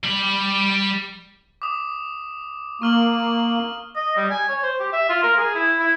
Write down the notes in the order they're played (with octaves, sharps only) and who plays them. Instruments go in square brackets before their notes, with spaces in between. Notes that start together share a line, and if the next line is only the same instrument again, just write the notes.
[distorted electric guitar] G3 B5
[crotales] D6 D#6
[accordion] A#3 [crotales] C#6 F6 F#7
[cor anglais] D#5
G3
G#5
C#5
C5
G4
E5
F4
A#4
G#4
E4
E4